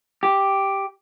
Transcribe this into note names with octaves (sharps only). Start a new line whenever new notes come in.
G4